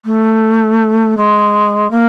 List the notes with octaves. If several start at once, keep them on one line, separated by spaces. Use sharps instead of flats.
A3
G#3
A#3